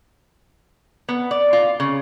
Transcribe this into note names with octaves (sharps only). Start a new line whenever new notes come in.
B3
D5
F4
C#3